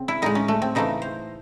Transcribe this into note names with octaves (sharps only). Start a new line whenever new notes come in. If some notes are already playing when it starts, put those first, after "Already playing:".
Already playing: C#3 C4
E4
A2 G#3 D#4
C#4
A3
C4
C#3 E3 A3 D#4
C5